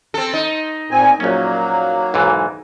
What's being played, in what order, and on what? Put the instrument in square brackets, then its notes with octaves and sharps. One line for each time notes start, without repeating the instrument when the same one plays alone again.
[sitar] C4 A4
D#4
[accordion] A#2 C4 G#5
[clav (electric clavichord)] A#1 C#4 [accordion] F#3 A#3
[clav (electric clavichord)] B1 G#2 E3